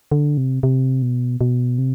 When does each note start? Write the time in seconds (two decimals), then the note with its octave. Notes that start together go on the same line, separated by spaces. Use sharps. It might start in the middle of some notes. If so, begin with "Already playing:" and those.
0.12 D3
0.37 C3
0.63 C3
1.02 B2
1.41 B2
1.78 C3